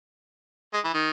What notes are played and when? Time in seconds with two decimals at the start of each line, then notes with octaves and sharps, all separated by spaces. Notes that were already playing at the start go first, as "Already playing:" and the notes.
0.74 G#3
0.84 E3
0.94 D#3